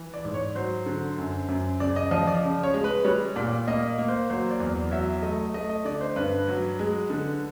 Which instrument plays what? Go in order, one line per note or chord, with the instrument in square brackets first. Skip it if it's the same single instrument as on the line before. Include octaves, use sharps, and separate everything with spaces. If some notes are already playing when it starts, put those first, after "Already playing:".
Already playing: [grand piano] E3
D5
G#2
C#5
F#3 C5
D3
F#2
F#2
C#3 D5
D#5
F3 D#5
D5
C#3
C#5
G#3
B4
G3 C#5
A#2 D5
A#3 D#5
A#3
C5
F#3 C5
D5
E2
F#3 E5
A3 D#5
A3 D#5
D#5
D3 D5
C5
G2 B4
F#3
G#3
D3